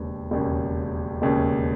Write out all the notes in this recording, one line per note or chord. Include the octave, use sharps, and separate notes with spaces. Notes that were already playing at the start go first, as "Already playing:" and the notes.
Already playing: E1 D#2 C#3
E1 D#2 C#3
E1 D#2 C#3